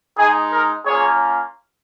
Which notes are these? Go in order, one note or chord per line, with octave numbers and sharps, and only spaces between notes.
G#3 D#4 G#4
A#4
A#3 C#4 F4 G#4 C#5